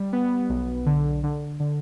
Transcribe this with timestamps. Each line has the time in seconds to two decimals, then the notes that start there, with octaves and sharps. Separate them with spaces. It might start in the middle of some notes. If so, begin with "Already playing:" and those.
Already playing: G3
0.13 B3
0.49 B1
0.86 D3
1.23 D3
1.60 D3